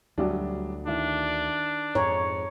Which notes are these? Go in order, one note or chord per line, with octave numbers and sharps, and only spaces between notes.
D2 F#3 G3 D4
D#3 D4 E4
F2 G#2 C#5 A#5